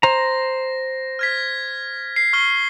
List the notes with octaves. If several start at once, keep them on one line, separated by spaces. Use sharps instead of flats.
C5 A#5 A#6
F6 G#6 B6
C7
C#6 F6 G7